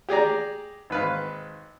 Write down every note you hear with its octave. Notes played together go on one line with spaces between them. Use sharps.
G4 G#4 D5 A#5
G#1 B4 F5